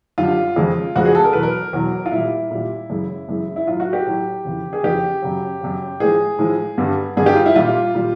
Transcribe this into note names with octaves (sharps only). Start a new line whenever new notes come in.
F#2 D3 G3 F4
F2 C#3 F3 G#3
F2 C#3 F3 G#3 F#4
G#4
A4
A#4
E2 B2 F#3 B4
A#4
E2 B2 F#3
F4
A#2 G3 E4
A#2 G3
F#2 C#3 E3 G#3
F#2 C#3 E3 G#3
E4
A2 F#3 F4
F#4
G4
A2 F#3
F2 C#3 E3
G#4
F2 C#3 E3 G4
F#2 C#3 F#3
F#2 C#3 F#3
A2 F3 G#3 G#4
A2 F3 G#3
G2 D3 G3
G2 D3 G3 G#4
G4
F4
E4
A#2 G3 F4
A#2 G3